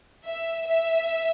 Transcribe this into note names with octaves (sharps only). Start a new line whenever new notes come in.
E5
E5